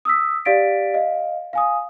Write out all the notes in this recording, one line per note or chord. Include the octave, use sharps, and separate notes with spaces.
D#6 E6 B6
G4 D5 F5 A6 B6 D7
D#5 F5
F5 G#5 D#6